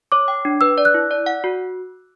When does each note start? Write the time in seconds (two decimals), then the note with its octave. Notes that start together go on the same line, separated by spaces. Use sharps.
0.12 C#5 D6
0.28 G5
0.45 D4
0.61 B4 E6
0.78 D5
0.85 F#6
0.94 E4
1.11 D5
1.26 F#5
1.44 F#4